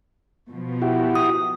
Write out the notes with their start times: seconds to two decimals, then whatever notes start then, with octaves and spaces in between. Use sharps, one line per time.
0.50 B2 F3
0.82 E4 F#4 G4
1.15 D#6